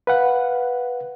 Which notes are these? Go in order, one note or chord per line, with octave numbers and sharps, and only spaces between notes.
B4 F5 F#5